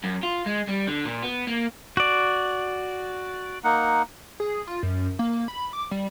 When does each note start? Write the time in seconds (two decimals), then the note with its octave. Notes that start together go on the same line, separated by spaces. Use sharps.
0.04 F#2
0.23 F4
0.46 G#3
0.68 G3
0.88 D3
1.06 A#2
1.23 B3
1.47 A#3
1.97 F#4 D5
3.64 A#3 D#4 F#5
4.40 G#4
4.67 F4
4.83 F#2
5.19 A#3
5.48 B5
5.73 D6
5.91 G3